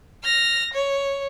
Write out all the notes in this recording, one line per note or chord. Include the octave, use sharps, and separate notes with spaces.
F6 A#6
C#5